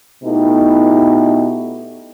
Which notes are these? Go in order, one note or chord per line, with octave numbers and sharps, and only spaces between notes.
B2 A3 D#4 E4 G4